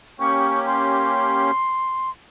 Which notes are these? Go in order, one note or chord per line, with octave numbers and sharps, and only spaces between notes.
A#3 C#4 G4 C#6
C6